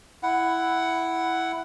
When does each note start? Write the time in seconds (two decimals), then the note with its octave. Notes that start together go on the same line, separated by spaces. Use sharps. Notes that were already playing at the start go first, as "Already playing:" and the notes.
0.23 E4 F#5